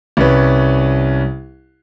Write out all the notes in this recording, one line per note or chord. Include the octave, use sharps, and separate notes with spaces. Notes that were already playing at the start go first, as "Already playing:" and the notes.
C2 C#4 B4